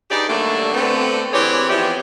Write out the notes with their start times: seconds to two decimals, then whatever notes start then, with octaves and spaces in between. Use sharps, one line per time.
0.11 G2 D#4 G4 G#4 D5
0.28 D3 F#3 G3 A3 A#3 D4
0.74 D3 A3 B3 C4
1.33 E3 C4 G4 G#4 C#5 D5
1.69 E3 F3 B3 E4 G4 D5